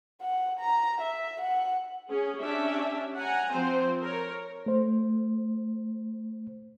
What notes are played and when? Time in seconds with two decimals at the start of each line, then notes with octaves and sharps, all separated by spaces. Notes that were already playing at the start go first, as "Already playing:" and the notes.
0.21 F#5
0.60 A#5
1.01 E5
1.41 F#5
2.09 C#4 G#4
2.40 C#4 D4 G4 E5
3.16 F#5 G#5 A#5
3.52 F3 C4 C5
4.02 A#4 C#5
4.66 A3 C5